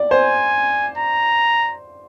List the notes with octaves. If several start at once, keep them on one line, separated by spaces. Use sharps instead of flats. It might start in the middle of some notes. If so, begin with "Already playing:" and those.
Already playing: D5
C5 G#5
A#5